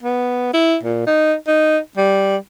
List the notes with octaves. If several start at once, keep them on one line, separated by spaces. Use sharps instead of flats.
B3
E4
A#2
D#4
D#4
G3